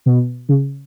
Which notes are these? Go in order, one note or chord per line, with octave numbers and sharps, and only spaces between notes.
B2
C#3